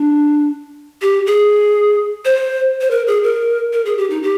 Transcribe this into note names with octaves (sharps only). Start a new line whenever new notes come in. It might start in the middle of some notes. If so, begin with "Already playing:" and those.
Already playing: D4
G4
G#4
C5
C5
A#4
G#4
A#4
A#4
G#4
G4
D#4
G4